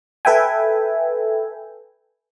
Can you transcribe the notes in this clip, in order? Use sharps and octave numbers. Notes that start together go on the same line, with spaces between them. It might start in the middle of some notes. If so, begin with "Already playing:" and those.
A4 B4 E5 G5 G#5